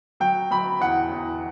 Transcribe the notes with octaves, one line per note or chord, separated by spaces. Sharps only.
F#3 G5
F#3 B5
E2 F#5
E2